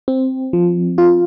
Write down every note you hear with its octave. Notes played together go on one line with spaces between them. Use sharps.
C4
F3
F4